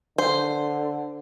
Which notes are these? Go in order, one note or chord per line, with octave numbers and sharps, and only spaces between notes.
D3 C5